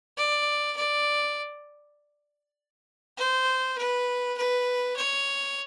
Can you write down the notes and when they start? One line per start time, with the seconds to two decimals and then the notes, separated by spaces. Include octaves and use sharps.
0.17 D5
0.76 D5
3.17 C5
3.77 B4
4.37 B4
4.96 C#5